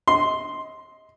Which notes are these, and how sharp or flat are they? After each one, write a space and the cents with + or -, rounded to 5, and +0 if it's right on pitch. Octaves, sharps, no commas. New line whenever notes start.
D#5 +30 C6 +0